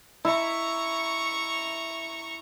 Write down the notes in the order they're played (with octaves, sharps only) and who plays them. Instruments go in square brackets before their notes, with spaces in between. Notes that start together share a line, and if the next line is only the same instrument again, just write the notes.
[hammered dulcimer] E4 [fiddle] A#5 C#6